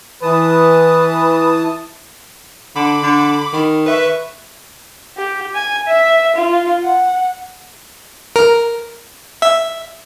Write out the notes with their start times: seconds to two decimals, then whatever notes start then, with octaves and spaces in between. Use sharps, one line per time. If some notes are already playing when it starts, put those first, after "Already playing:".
0.23 E3 B4 A5 D#6
2.76 D3 B5 D6
3.03 D3
3.53 D#3
3.86 B4 E5 C#6
5.17 G4
5.55 G#5
5.88 E5
6.36 F4
6.83 F#5
8.36 A#4
9.42 E5